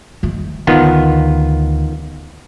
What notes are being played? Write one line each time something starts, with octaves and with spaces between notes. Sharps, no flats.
D#3 A3
D2 D#3 B3 F4